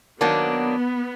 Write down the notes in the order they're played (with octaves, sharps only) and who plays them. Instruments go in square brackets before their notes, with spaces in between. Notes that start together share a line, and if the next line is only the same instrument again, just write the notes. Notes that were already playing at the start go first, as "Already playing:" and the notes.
[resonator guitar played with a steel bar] D#3 F#3 A#3 D4 [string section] B3